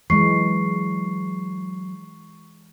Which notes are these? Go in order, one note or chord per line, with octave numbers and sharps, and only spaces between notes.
E3 F#3 G#3 C#6 C7